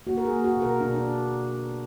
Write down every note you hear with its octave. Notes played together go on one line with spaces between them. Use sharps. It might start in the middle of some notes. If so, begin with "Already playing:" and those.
A#3 F#4
A#4
G#4
A#3
F#4
B2
A#4
B2 D4
D4